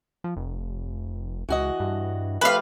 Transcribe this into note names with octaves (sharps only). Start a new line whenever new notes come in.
F3
F1
C#2 E3 F#4 D#5
G2
F3 A3 G4 B4 F5